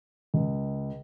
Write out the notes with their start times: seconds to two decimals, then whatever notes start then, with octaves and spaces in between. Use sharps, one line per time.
0.34 C#2